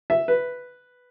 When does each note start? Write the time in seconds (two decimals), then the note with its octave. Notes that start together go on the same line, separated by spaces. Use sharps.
0.10 E5
0.28 B4